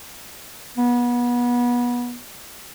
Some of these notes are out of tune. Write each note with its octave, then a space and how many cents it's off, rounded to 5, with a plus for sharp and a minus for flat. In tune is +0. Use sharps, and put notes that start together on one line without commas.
B3 -30